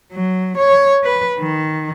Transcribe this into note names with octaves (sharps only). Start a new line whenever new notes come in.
F#3
C#5
B4
D#3